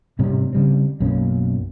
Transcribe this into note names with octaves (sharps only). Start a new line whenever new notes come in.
G#2 C3 G3 C#4
C#3 G3 C4
B1 F#2 A#3 C#4